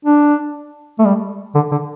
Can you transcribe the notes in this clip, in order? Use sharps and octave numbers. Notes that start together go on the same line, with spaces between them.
D4
A3
G3
D3
D3